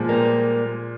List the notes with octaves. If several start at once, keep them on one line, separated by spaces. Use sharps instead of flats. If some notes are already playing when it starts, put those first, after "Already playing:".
Already playing: A#2 F3 G#3
G3 A#3